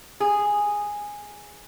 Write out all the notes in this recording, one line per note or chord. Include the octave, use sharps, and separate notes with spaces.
G#4